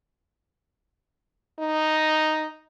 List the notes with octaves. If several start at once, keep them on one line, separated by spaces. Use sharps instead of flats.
D#4